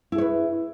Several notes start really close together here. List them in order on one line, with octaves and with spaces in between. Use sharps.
E4 G#4 C#5 B4